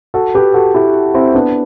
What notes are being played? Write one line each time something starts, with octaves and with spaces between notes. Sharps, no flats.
F#4 A4
G4 B4
F#4 A4
E4 G4
C4 E4
B3 D4